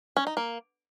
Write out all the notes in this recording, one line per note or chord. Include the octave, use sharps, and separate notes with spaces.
C#4
D#4
A#3